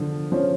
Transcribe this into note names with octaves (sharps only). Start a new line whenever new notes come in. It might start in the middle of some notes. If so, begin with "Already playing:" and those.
Already playing: D3 F3
F3 C#4